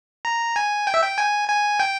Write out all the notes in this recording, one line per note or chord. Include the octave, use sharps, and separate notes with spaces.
A#5
G#5
G5
E5
G5
G#5
G#5
G5